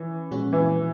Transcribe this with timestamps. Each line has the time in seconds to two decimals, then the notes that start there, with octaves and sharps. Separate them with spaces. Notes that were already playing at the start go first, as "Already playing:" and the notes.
Already playing: E3 C#4
0.31 A#2 F3 G#3 C#4 F#4
0.53 E3